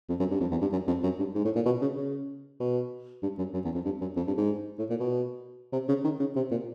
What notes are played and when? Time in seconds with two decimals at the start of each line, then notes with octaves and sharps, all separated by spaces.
0.09 F2
0.20 F#2
0.30 G2
0.41 F2
0.51 E2
0.62 G2
0.72 F#2
0.87 F2
1.03 F#2
1.19 G2
1.35 G#2
1.45 A2
1.56 A#2
1.66 B2
1.82 C#3
1.97 C#3
2.60 B2
3.23 G2
3.38 F#2
3.54 F#2
3.64 E2
3.75 F2
3.85 G2
4.01 F#2
4.17 F2
4.27 G2
4.37 G#2
4.79 A2
4.90 A#2
5.00 B2
5.73 C3
5.89 C#3
6.04 D#3
6.20 C#3
6.36 C3
6.51 A#2